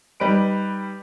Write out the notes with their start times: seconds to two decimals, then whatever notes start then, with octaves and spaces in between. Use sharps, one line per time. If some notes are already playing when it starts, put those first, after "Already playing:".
0.20 G3 D#4 B4 D7